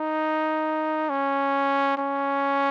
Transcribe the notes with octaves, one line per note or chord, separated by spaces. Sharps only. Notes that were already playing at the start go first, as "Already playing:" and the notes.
Already playing: D#4
C#4
C#4